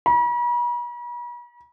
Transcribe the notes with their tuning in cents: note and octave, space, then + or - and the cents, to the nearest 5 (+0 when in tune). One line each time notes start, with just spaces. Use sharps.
B5 -45